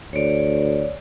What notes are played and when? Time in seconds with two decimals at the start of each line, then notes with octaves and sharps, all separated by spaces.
0.13 D2 C#5 D5